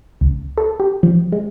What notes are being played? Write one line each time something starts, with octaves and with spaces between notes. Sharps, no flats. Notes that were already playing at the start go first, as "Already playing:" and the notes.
C#2
A4
G4
F3
G#3